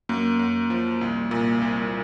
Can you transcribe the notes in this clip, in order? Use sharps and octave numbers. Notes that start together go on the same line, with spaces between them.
F#2 A#3
F#2
F3
C2
A#2
C2